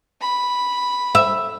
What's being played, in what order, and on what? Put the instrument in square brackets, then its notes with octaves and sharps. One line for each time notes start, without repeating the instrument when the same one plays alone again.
[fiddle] B5
[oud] E5